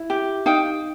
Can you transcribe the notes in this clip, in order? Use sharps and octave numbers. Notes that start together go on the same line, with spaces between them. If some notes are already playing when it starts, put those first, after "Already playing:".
Already playing: E4
G4
D#4 F5 G5